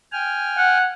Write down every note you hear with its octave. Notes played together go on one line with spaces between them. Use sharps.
G5 G#5 F6
F#5